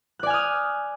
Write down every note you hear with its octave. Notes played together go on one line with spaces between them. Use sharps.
D5 G#5 D#6 F6 F#6